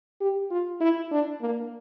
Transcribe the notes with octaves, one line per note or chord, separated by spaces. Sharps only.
G4
F4
E4
D4
A#3